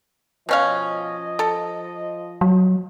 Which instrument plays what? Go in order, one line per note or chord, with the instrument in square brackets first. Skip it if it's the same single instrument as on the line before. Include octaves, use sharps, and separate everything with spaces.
[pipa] B2 C#4 F5 [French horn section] F3 D#5
[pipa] A4
[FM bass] F#3